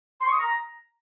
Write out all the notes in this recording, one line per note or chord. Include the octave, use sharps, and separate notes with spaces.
C6
C#6
D#6
A#5